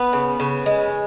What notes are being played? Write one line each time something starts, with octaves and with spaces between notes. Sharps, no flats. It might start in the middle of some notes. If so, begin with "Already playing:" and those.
Already playing: B3 B4
C#3
C#3
G#3